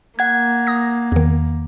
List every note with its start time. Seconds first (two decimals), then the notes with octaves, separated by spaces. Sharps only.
0.19 A#3 F#5 G#6
0.67 D#6 A#6
1.12 E2 D#3